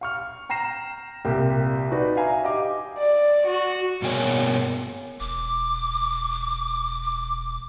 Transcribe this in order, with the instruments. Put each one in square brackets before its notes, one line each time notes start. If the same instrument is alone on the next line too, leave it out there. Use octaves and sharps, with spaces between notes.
[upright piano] F5 C#6 F6
G5 A#5 A#6 C7 E7
C2 A#2 G4 A#4
D#4 F#4 B4 D5
E5 F5 G#5 A#5
G4 D#5 F5 D6
[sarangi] D5
F#4
[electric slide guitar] G2 B2 A#3 G#4 C#5
[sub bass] E1 [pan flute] D6